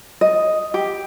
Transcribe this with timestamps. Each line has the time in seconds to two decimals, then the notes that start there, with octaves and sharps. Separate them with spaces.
0.21 D#5
0.74 G4